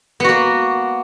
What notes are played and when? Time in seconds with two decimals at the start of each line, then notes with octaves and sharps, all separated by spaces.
0.20 B3
0.24 F#4
0.29 A#3